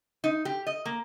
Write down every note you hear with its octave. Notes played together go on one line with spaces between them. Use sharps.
D#4
G4
D#5
A#3